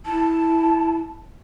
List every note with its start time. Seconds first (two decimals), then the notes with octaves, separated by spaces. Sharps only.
0.06 E4 A5